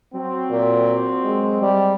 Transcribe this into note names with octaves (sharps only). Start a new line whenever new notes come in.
F#3 C4
A#2
G#3
G3